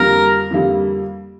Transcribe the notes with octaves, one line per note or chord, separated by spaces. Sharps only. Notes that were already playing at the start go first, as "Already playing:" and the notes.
Already playing: F2 D3 G3 A#3 A#4
F2 D3 G3 A#3